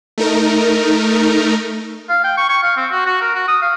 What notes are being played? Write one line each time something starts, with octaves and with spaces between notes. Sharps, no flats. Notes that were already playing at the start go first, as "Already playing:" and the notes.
A3 D#4 A#4
F5
G5
C#6
C#6
F5
C4
F#4
F#4
A#4
F#4
D#6
F5